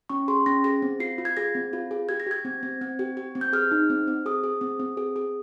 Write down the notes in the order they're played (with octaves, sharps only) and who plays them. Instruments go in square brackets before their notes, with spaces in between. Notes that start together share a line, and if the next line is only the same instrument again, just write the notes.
[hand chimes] C#4 C#6
G#4 C6
C#4 A#6
G#4 A#6
C4
F4 C7
F4
G#6
G#4 A#6
C4
F4
G#4
G4 G#6
A#6
G4 G#6
C4
C4
C4
G4
G4
C4
G6
G#4 F6
D#4
C4
C4
G#4 D#6
G#4
C4
C4
G#4
G#4